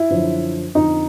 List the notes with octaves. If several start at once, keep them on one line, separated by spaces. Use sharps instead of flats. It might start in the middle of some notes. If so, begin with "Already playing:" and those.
Already playing: E4
F#2 D3 F3
F2 D3 F3 D#4